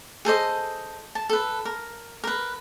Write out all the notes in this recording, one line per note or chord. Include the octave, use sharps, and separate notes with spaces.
G#4 A4 C5 D#5
A5
A4 B4
A#4
A#4 B4